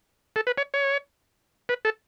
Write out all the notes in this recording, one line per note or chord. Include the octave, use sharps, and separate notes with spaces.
A4
B4
C#5
C#5
B4
A4